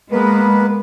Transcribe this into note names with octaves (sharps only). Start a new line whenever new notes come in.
G#3 A#3 B3 B4